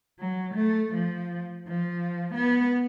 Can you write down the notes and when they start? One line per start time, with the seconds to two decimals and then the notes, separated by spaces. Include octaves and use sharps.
0.19 F#3
0.55 A3
0.94 F3
1.68 F3
2.34 B3